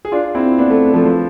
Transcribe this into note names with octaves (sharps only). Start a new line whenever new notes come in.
G#4
D4 F4
C4 E4
B3 D4
A3 C4
F3 A3
F3